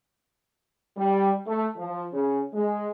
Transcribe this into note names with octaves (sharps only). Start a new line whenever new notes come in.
G3
A3
F3
C#3
G#3